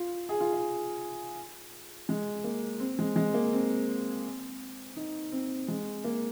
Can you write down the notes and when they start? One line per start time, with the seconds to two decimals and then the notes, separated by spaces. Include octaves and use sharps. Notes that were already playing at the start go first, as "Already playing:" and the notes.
Already playing: F4
0.29 G#4
0.40 F4
0.53 G#4
2.09 G#3
2.44 A#3
2.80 C4
2.99 G#3
3.16 G#3
3.34 A#3
3.53 C4
4.96 D#4
5.32 C4
5.68 G#3
6.04 A#3